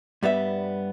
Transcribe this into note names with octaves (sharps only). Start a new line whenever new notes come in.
G2 G3 B3 E5